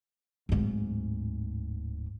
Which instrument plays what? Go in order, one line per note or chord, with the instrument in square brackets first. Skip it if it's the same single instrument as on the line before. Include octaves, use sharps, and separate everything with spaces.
[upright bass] D1 G#2